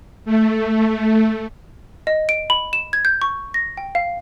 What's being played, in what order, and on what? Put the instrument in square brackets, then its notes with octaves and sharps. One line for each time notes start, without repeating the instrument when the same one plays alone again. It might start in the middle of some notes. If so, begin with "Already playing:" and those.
[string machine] A3
[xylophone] D#5
D7
B5
E7
G#6
G6
C#6
A#6
G5
F5